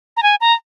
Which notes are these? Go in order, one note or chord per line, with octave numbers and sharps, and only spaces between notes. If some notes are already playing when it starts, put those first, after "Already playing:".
A#5
G#5
A#5